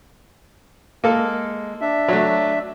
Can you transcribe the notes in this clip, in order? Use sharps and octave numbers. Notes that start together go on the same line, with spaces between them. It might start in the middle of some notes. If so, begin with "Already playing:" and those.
G#3 A#3 A4
D4 E5
F#3 A3